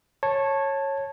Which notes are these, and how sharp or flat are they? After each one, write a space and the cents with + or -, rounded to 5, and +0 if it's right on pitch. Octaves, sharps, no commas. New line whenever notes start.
C#5 -15 A5 +0